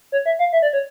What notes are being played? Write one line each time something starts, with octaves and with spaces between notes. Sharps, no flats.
C#5
E5
F5
E5
D5
C#5